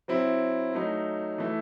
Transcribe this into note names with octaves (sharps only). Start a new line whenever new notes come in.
F#3 C4 E4
F#3 A3 D#4
E3 A3 E4